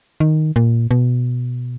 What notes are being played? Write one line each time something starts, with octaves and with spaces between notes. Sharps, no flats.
D#3
A#2
B2